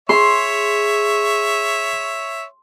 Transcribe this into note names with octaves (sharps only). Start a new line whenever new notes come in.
G#4 C#5 E5 C6